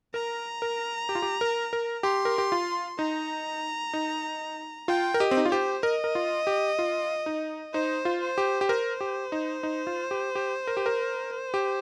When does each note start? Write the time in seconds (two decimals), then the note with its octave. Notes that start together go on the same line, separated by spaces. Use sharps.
0.14 A#4 A#5
0.62 A#4
1.09 G4
1.15 F4
1.22 G4
1.41 A#4
1.73 A#4
2.03 G4 C6
2.25 A#4
2.38 G4
2.52 F4
2.99 D#4 A#5
3.93 D#4
4.88 F4 G5
5.14 A#4
5.20 G4 D#5
5.31 C4
5.37 D#4
5.45 F4
5.52 G4 C5
5.83 A#4 D#5
6.04 A#4
6.15 F4
6.47 G4
6.79 F4
7.26 D#4
7.73 D#4 C5
8.05 F4
8.21 C5
8.38 G4
8.61 G4
8.68 A#4 C5
9.01 G4
9.32 D#4
9.63 D#4
9.87 F4
10.11 G4
10.35 G4
10.67 A#4
10.77 G4
10.86 A#4
11.54 G4